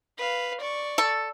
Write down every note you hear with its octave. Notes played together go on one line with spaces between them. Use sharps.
B4 F5
D5 C#6
A4